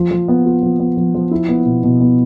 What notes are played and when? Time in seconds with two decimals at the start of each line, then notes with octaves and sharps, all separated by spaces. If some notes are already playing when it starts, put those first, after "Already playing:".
Already playing: F3 F4
0.11 F3
0.28 B3
0.45 F4
0.63 F3
0.80 B3
0.97 F3
1.15 F3
1.31 E4
1.48 B3
1.66 B2
1.83 B2
2.01 B3